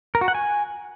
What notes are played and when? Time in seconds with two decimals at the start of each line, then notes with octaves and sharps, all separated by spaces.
0.15 A#4
0.21 F#4
0.28 F#5
0.35 G#5